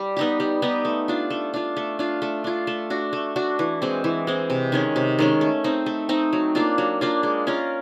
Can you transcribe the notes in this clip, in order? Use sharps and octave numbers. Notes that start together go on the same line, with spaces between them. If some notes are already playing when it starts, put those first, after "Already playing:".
Already playing: G3
B3 D#4 G4
G3
B3 D#4 G4
A3
D4 F4
A3
D4 F4
A3
D4 F4
A3
D4 F4
A3
D4 F#4
A3
D4 F#4
E3
G#3 C4
E3
G#3 C4
C3
D#3 G#3 C#4
C3
D#3 G#3 C#4
A3
C4 D#4
A3
C4 D#4
F#3
A#3 D4 F4
F#3
A#3 D4 F4
G#3
C#4 F4 A#4